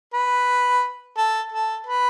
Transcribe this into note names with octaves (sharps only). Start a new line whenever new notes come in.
B4
A4
A4
B4